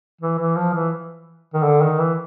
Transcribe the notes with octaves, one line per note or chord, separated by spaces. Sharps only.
E3
E3
F3
E3
D#3
D3
D#3
E3